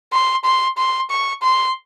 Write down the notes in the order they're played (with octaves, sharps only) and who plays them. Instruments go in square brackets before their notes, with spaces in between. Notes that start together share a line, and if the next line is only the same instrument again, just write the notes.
[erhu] C6
C6
C6
C#6
C6